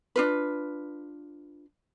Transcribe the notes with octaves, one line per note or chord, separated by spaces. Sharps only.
D4 F4 B4